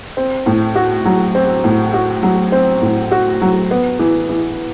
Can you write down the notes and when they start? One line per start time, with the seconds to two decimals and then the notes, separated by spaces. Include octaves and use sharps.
0.17 C4
0.46 A2
0.75 F#4
1.05 F#3
1.35 C4
1.64 A2
1.94 F#4
2.23 F#3
2.52 C4
2.82 A2
3.11 F#4
3.42 F#3
3.71 B3
3.99 E3
4.29 E3